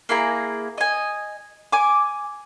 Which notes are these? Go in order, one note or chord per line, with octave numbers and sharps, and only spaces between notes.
A#3 E4 G#4 A#5
D#5 G#5
G#5 D6